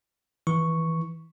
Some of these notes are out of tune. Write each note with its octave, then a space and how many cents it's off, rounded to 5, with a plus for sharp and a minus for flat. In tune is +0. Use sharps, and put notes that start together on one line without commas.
E3 -15 C#6 +0